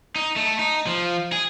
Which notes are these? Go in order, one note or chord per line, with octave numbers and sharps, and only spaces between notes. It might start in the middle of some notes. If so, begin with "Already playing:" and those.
D#4
A3
D#4
F3
G#4